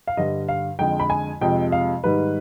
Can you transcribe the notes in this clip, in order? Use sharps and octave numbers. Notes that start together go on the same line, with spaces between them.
F5
G2 D3 G3 D#5
F5
F2 D3 F3 G#3 G5
B5
G#5
F2 C3 F3 G#3 G5
F5
G#2 D#3 G3 B4